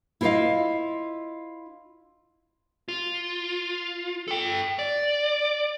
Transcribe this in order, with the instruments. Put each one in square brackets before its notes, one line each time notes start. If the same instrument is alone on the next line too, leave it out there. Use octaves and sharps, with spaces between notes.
[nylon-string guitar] E4 F4 C5 C#5 D#5 F5
[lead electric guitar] F4
A4 G5
D5